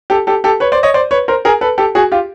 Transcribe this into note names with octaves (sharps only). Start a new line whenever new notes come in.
G4 A4
G4 A4
G4 A4
B4 C#5
C5 D5
C#5 D#5
C5 D5
B4 C#5
A#4 C5
G#4 A#4
A4 B4
G4 A4
F#4 G#4
F4 G4